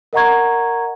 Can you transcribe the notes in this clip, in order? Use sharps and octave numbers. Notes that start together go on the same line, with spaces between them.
A#4 D#5 F#5 A#5 C#6 G#6